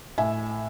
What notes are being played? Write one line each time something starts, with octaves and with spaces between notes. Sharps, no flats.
A2 E5 G#5